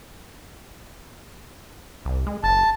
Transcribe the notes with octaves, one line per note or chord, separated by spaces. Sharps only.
C2
G#3
F#1 A5